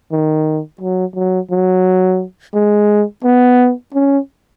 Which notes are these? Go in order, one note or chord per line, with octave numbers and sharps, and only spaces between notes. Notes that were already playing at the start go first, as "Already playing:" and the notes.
D#3
F#3
F#3
F#3
G#3
B3
C#4